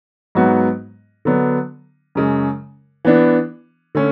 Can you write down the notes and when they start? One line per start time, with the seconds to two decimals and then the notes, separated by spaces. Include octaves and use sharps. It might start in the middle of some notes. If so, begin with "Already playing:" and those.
0.35 G#2 F#3 B3 F#4
1.25 D3 F#3 B3 D4
2.15 F#2 C#3 G#3
3.05 E3 B3 D4
3.95 D3 A3 C#4